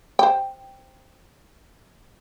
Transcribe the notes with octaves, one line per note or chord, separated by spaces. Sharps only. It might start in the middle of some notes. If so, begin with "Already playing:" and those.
C5 G5